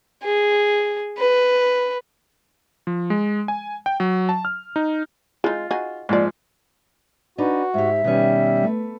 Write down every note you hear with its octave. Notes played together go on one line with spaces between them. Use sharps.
G#4
B4
F3
G#3
G#5
G5
F#3
A5
F6
D#4
G#3 D#4 F4
D#4 F#4 G#4
G#2 F3 A#3 D5
D4 D#4 F#4 B4
G#2 G4 E5
B2 D#3 G3 C#4
A3 B4